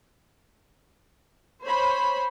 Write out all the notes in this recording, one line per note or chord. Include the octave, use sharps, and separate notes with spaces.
C5 C#5 B5